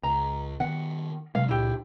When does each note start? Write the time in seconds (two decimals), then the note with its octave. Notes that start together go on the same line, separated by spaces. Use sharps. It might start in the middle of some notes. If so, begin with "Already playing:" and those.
0.03 C#2 A#5
0.60 D#3 B3 F#5
1.35 C3 F#3 G#3 F5
1.49 C#2 A#2 E4 G4